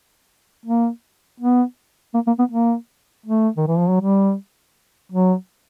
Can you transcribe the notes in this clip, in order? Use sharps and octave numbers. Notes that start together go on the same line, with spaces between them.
A#3
B3
A#3
A#3
B3
A#3
A3
D#3
E3
F3
F#3
G3
F#3